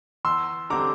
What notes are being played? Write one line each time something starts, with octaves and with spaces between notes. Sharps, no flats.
E2 C6 E6
D3 G3 C4 A#5 D6